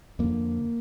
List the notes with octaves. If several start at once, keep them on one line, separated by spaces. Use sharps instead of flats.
F2 D3 A#3